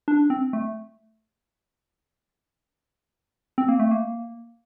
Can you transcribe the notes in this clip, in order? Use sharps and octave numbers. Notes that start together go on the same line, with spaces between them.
D4
C4
A3
C4
A#3
A3
A#3